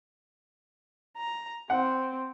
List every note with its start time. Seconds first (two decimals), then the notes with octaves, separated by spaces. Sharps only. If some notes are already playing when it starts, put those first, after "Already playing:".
1.17 A#5
1.70 C4 F#5